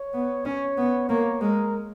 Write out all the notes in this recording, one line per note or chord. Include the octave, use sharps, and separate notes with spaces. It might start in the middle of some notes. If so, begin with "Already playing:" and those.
Already playing: C#5
B3
C#4 C#5
B3
A#3 C#5
G#3 A#4